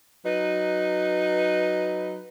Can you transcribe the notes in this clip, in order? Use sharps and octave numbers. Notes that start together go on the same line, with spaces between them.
F#3 D#4 B4